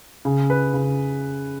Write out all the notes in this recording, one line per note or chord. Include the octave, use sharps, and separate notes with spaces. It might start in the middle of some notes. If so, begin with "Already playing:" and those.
C#3
B4
C#3